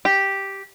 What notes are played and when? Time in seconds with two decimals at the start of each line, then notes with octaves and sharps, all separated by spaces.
0.05 G4